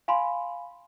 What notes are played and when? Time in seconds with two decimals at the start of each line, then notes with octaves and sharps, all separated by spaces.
0.08 F5 G#5 B5 C6